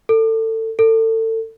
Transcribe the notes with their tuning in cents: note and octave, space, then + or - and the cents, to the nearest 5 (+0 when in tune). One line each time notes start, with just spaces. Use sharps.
A4 +25
A4 +30